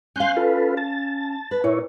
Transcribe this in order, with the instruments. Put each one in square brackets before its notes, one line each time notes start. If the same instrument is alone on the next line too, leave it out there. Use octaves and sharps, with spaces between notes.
[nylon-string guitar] C#4 F5 [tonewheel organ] C6 F#6 G6
[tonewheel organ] F4 A4 B4
A5
[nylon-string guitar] B4
[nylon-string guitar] A#2 [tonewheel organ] E4 C#5